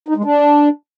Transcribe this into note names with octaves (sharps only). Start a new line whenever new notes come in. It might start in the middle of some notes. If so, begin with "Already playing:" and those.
D#4
G#3
D4